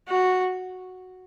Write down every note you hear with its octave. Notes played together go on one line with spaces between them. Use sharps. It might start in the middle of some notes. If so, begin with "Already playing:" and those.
F#4